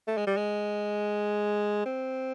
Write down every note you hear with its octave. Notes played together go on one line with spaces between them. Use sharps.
A3
G#3
G3
G#3
C4